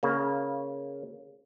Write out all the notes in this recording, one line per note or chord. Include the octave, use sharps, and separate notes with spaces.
C#3 A#3